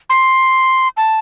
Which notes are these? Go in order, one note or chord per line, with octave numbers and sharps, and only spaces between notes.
C6
A5